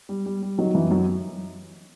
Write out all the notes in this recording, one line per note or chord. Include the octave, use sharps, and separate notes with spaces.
G3
G3
G3
D#3 F#3
F#2 E3
F#2 F#3